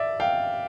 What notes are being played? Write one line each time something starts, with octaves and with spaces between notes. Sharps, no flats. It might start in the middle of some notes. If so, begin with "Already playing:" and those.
Already playing: D5 E5
F5 G5